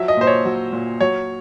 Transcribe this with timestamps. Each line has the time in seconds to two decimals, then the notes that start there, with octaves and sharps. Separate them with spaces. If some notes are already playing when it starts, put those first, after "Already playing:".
Already playing: F3 F#3 E5
0.08 D#5
0.17 A#2 C5
0.27 C#5
0.45 F#3
0.73 A#2
1.00 F#3 C#5